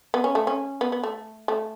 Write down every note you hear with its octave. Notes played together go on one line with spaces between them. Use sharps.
B3
C#4
A3
C#4
B3
B3
A3
A3